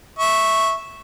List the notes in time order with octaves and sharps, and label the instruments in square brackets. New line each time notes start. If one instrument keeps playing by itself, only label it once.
[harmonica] E5 C#6